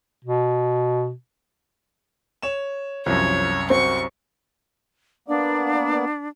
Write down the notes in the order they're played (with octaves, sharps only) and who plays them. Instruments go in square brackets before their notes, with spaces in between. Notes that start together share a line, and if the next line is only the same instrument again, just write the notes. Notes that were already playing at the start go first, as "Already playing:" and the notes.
[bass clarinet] B2
[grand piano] C#5 E7
[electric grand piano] C2 F#2 [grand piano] F3 [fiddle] C#5
[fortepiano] C4 [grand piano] F#4 [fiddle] C#6
[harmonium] A#3 B3 D5 [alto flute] D4